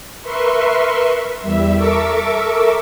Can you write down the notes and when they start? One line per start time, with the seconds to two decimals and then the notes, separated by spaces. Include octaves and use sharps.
0.22 A#4 B4 E5 C6 C#6
1.40 E2 G3 E5
1.74 A4 A#4 E5 C#6 D6 E6